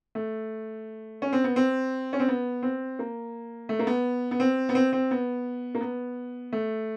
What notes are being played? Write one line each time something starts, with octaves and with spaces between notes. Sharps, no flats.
A3
C#4
C4
B3
C4
C#4
C4
B3
C4
A#3
A3
A#3
B3
B3
C4
B3
C4
C4
B3
A#3
B3
A3